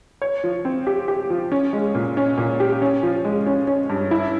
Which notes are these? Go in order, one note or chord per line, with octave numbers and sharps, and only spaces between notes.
C#5
F3
C4
G4
G4
F3
C#4
G#3
A#2
C#4
A#2
G4
C#4
F3
G#3
C#4
C#4
G2
E4